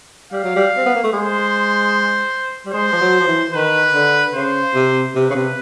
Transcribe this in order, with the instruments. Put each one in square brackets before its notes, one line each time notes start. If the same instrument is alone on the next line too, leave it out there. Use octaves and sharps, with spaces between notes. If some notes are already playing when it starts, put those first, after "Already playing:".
[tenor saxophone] G3 [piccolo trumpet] F5
[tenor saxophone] F#3
G3
C4
B3
A#3
A3
[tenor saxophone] G#3 [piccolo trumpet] C5
[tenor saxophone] G3
[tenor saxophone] G#3 [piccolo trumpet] C5
[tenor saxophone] F3
F#3
F3
E3
[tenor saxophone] D#3 [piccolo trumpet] B4
[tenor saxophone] D3
[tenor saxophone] C#3 [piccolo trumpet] C5
[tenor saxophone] C3
[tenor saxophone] C3 [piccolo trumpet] B4
[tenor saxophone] C#3
C3